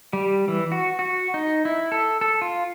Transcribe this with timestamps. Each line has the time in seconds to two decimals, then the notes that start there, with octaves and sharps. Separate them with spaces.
0.13 G3
0.48 E3
0.72 F#4
0.99 F#4
1.34 D#4
1.65 E4
1.92 A4
2.21 A4
2.42 F4